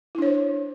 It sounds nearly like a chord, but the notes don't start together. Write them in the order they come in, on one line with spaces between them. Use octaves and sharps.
E4 D4 C#5 C5